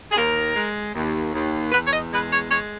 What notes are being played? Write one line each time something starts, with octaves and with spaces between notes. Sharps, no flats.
G#4
D#2 A#4
G#3
D#2
D#2
E2 B4
C#5
D#5
G#3 B4
C#5
G#3 C#5